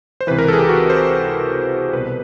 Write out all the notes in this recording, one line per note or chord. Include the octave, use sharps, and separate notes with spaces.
C5
C#2 C3 E3 B4
A#4
G#4 A4
G4
F#4
C5
C2 B2 B4